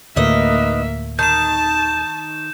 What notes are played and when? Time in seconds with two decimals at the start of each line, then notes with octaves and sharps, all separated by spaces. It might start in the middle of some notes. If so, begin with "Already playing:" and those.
0.16 D2 A2 D#3 A#3 B4 D#5 E5
1.19 D#3 A5 G6 E7